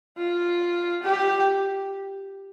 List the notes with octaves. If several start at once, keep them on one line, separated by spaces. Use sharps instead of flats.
F4
G4